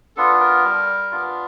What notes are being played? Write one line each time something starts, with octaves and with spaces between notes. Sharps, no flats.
B3 D4 F4 A4
A#4
G3
B3 D4 F4